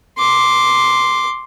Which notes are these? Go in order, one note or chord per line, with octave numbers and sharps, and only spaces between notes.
C6 D6